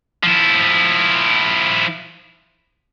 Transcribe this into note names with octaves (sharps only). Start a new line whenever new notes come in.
F3 E4